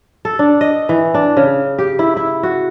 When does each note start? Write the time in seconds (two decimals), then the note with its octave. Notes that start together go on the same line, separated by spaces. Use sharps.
0.25 A4
0.39 D4
0.61 D#5
0.89 E3
1.14 D4
1.37 C#3
1.79 G4
1.99 E4
2.17 E4
2.43 F#4